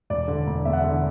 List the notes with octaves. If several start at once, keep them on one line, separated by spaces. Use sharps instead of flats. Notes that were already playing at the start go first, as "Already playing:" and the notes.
E1 D5
D3
E1
E2 E5
F#5
D3 E5